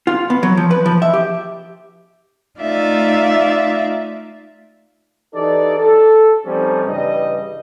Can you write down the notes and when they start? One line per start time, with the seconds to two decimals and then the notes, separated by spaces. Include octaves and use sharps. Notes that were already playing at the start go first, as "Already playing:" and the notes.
0.07 F4
0.30 B3
0.43 F#3
0.57 F3
0.71 B4
0.86 F3
1.02 E5
1.14 G4
2.59 A3 D#4 F4 D5 E5 F5
5.34 E3 D#4 G4 A4 D5
5.78 A4
6.45 F3 G3 A3 C4 C#4 D#4
6.86 G2 C#3 E3 G3 D#5